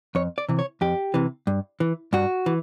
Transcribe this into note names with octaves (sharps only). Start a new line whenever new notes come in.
F2 C#5
D5
C3 E3
C#5
F2 G4
C3 E3
G2
E3
G2 F#4
E3